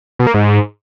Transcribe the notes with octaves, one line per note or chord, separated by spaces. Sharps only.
B2
A#3
G#2